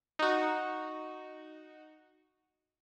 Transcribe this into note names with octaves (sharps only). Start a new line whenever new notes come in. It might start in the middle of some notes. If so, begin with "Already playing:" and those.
D#4 F#4